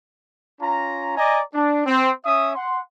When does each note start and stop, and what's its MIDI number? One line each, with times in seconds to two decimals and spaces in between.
0.60 1.13 61
0.60 1.13 65
0.60 1.13 82
1.18 1.41 74
1.18 1.41 75
1.18 1.41 80
1.18 1.41 82
1.54 1.85 62
1.86 2.11 60
2.26 2.55 61
2.26 2.55 76
2.26 2.55 87
2.55 2.79 78
2.55 2.79 84